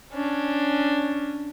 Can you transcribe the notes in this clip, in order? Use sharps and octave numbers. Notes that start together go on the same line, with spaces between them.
C#4 D4